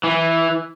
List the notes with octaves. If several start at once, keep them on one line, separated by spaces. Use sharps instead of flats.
E3